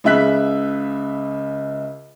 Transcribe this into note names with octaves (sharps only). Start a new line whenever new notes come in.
C#2 C#3 E5 F#6 B6